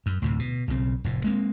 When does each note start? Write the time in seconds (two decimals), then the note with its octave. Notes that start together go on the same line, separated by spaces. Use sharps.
0.06 F#2
0.22 D2 A2 C3
0.39 B2
0.68 B1 C#3 C4
1.04 F1 A2
1.24 G#3 A#3 C4